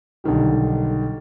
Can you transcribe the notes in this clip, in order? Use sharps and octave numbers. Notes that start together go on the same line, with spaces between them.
B1 D3 D#3 G3